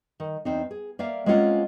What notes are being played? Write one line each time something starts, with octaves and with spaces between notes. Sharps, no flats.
D#3
E2 C4 D#4
G#4
A#3 D5 E5 F5
G#3 A#3 C4 C#4 F4 F#5